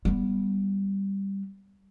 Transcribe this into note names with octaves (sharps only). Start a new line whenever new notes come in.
G3 B3